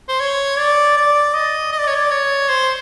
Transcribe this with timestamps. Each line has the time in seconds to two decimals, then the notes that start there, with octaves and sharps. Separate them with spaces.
0.08 C5
0.20 C#5
0.58 D5
0.97 D5
1.35 D#5
1.73 D#5
1.80 D5
1.87 C#5
1.95 D5
2.11 C#5
2.49 C5